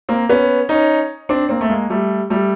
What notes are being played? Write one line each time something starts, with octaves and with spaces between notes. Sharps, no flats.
A#3 C4
B3 C#4
C#4 D#4
C4 D4
A#3 C4
A3
G#3 A#3
G3 A3
G3 A3